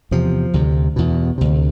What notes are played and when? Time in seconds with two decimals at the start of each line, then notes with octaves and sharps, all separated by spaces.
0.11 E2 C3 F3
0.54 D2 C3
0.96 E2 B2
1.38 D2 C3